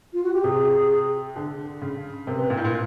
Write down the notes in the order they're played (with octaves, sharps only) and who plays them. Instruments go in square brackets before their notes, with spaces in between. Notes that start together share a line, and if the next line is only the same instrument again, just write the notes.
[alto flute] F4
F#4
G4
[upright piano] C3 [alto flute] G#4
[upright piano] D3
C#3
[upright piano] C3 [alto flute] A#4
[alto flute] B4
[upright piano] A#2 [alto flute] A#4
[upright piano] A2
A#2